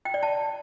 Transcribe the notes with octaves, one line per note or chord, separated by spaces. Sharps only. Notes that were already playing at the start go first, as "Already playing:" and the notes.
G5
D5
A5